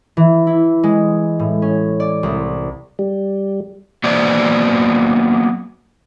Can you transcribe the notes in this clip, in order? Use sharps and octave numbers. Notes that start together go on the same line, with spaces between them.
E3
E4
G#3
A2
C#4
D5
C2
G3
F#3 A#3 B3 C5 D5